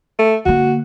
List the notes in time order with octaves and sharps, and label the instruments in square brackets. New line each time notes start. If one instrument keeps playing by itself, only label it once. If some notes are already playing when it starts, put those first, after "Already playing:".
[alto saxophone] A3
[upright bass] D3 A#3 [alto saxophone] F#4